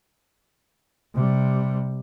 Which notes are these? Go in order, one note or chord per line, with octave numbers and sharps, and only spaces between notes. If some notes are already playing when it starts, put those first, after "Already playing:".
C3 G3